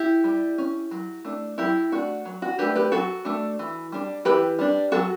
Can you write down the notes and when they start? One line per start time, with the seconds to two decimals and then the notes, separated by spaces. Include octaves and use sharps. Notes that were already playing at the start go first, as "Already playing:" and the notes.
Already playing: E4 G4
0.24 G3
0.58 C#4
0.91 F#3
1.25 A3 D4
1.58 F#3 E4 G4
1.92 A3 D4 F#4
2.25 F#3
2.42 F#4
2.59 A3 D4 G4 B4
2.76 G4 B4
2.91 F#3 F#4 A4
3.25 A3 D4
3.59 E3
3.92 G3 D4
4.25 E3 G4 B4
4.59 G3 D4
4.92 F#3 F#4 A4